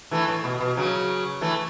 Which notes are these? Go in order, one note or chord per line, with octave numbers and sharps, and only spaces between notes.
E3 A3
A2
B2
B2
C#3 F#3
E3 A3